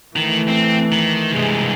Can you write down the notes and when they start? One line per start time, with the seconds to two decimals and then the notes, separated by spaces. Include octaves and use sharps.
0.16 D#3 E3 A3
0.48 C4
0.92 D#3
1.32 G2 C3 E3 G#3